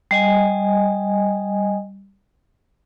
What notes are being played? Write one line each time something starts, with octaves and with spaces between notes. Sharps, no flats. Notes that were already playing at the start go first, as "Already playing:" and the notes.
G3 D#5 G#5